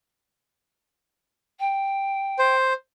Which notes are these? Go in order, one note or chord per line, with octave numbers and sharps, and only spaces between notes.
G5
C5